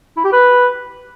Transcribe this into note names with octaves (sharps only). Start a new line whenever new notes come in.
E4
G4
B4